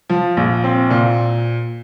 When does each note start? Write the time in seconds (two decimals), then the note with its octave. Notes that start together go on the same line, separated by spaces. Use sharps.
0.09 F3
0.37 A#1
0.64 C4
0.90 A#2